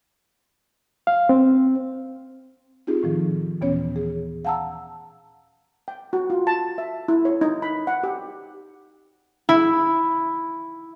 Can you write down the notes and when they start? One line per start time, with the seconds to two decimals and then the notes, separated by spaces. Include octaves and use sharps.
1.07 F5
1.29 C4
2.87 C4 D#4 F4 G4 G#4
3.03 A2 D#3 F3
3.61 D#2 A#2 E3 B3 C#4 C#5
3.96 G#4
4.45 F5 F#5 A5 A#5 E6
5.88 G5
6.13 F#4
6.30 F4
6.47 A5
6.78 E5
7.08 E4
7.25 C#5
7.41 D#4
7.62 B5
7.87 F#5
8.03 G4
9.49 E4